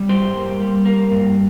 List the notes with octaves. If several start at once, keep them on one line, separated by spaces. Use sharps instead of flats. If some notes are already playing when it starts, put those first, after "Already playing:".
Already playing: G3
G2 G4 C5
A#3
G3
A#3
G2